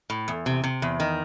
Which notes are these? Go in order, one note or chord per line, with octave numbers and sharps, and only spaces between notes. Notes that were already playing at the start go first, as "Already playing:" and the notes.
A2
E2
C3
C3
E2
D#3